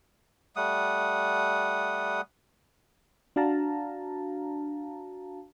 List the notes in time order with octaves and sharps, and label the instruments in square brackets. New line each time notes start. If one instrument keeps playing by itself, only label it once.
[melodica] G3 A3 F#5 D#6
[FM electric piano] D4 F#4 F5 A5 A#5